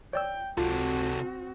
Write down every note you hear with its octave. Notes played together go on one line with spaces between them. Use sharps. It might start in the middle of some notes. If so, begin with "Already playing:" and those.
C#5 D5 G5 E6
C#2 C3 C4 F4 F#4 A4